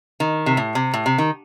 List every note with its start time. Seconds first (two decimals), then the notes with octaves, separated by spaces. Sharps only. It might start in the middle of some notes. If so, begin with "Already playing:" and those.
0.20 D#3
0.46 C3
0.57 A2
0.75 C3
0.94 A2
1.06 C3
1.18 D#3